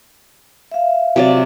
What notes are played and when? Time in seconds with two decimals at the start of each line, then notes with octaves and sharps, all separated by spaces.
0.71 E5 F5
1.16 C3 F#3 D5